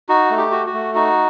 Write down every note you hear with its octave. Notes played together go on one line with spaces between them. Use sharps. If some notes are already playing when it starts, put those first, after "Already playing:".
D#4 F#4
A3
G4
F#4
F#4
A3
D#4 F#4